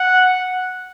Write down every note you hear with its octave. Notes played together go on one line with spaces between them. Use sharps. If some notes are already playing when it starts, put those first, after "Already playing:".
Already playing: F#5